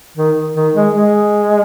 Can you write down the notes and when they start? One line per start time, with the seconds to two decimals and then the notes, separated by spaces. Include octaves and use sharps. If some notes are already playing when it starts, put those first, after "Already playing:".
0.17 D#3
0.55 D#3
0.75 G#3
0.95 G#3